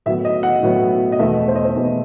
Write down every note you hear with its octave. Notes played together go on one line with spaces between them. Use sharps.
A2 F#3 B3 E5
D#5
F#5
A2 F#3 B3
D#5
E2 B2 A3 E5
C5
D#5
C5
E2 B2 A3 B4